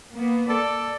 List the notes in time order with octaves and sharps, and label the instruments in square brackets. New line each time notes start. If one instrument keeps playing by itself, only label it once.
[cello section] A#3 B3
[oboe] A4 [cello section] D5